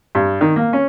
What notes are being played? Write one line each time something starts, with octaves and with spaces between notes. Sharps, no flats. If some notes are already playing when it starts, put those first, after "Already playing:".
G2
D#3
A#3
C#4